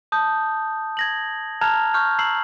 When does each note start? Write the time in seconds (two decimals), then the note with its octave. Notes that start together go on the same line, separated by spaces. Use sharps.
0.12 A5 D#6 G6
0.97 G#6 A#6 F#7
1.61 A5 A#5 F6 F#6 G#6 F7
1.94 C#6 F6 G6
2.19 A#5 E6 C7 F#7